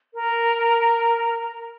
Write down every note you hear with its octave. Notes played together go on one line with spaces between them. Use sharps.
A#4